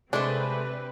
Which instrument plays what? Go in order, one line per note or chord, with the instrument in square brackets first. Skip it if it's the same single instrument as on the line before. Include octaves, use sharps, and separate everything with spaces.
[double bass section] C3 [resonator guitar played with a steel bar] G#3 A3 C5 [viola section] C4 B4 [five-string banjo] D4